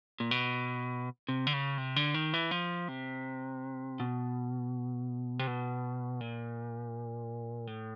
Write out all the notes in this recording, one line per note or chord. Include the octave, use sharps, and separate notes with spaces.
A#2
B2
C3
D3
C#3
C3
D3
D#3
E3
F3
C3
B2
C3
B2
A#2
A2